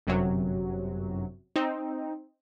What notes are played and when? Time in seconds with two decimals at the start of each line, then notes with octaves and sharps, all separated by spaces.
0.07 G1 F#2 C3 F#3
1.56 C4 D#4